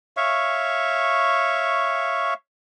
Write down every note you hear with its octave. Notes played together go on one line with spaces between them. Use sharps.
C#5 E5 F5 C#6